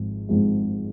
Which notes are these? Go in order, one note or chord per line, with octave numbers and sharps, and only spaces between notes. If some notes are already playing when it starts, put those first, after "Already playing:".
Already playing: G#1 G#2 F3 G#3
G#1 G#2 F3 G#3